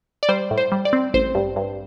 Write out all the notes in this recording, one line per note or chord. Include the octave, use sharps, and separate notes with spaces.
D5
G3 C5
A2
C5
G3
D5
C4
A1 C5
G2
G2